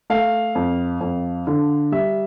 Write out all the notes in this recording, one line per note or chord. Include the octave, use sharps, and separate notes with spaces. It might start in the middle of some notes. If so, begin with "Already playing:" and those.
A3 F5
F2
F2
D3
G3 E5